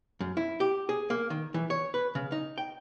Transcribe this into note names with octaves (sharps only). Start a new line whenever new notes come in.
F#2
E4
G4
G#4
A#3
D#3
E3
C#5
B4
C#3
D#4
G5